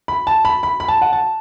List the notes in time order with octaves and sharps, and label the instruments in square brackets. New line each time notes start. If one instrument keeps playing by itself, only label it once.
[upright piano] B5
A5
B5
B5
B5
A5
F#5
A5